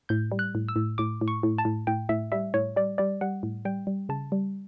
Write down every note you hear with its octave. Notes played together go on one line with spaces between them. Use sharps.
A2 G6
G3
F#6
A2
E6
A2
A2 D6
A2
C#6
A2
A5
A2
A2 G5
A2 E5
G3 E5
A2 C#5
G3 D5
G3 D5
G3 F#5
A2
G3 G5
G3
C#3 A5
G3